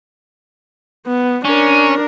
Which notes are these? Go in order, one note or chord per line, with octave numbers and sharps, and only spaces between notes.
B3
C#4 D4 A#4